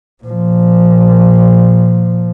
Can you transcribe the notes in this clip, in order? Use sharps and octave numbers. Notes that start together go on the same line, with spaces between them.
A#2 F3